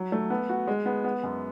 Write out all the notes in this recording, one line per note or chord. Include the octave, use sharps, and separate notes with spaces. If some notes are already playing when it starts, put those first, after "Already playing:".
Already playing: F#3
A3
B3
F#4
G#3
B3
B3
F#2